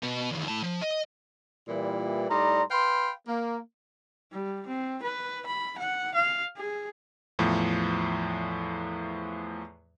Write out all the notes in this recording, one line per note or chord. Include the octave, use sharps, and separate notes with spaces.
B2 B4
E2 D#3
A2 A5
F3
D#5
A#2 E3 G3
A2 G3 D#4 D5 A#5 C6
B4 F5 G5 B5 C6
A#3
G3
C4
B4
B5
F#5
F5
G#4
E2 A2 F3